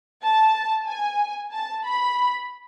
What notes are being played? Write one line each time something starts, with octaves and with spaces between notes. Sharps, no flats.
A5
G#5
A5
B5